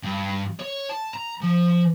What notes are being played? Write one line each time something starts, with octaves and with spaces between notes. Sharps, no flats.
G2
C#5
A5
A#5
F3